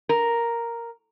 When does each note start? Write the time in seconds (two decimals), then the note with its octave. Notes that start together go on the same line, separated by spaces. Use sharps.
0.09 A#4